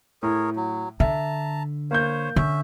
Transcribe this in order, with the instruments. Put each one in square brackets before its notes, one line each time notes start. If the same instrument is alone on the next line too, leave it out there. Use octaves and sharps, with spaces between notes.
[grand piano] A2 [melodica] G#4 A#4 C#5
[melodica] F#3
[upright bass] D3 [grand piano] E5 [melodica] A5 A#5
[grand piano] A#3 G6 [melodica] C5 C#5
[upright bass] D3 [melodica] C#4 E5